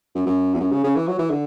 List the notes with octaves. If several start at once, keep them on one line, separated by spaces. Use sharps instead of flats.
F#2
F#2
E2
F#2
C#3
C#3
E3
F#3
E3
D3